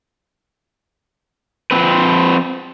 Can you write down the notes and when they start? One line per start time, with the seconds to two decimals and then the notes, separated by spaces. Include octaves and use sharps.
1.71 F3 C4 B4